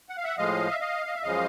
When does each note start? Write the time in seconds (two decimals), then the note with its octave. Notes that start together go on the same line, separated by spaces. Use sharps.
0.09 F#5
0.17 F5
0.24 E5 F#5
0.37 A2 F3 G#3 D#5 F5
0.71 E5
0.80 D#5 F5
1.07 D#5
1.15 E5
1.23 F#2 C#3 F3 G#3 D#5 F5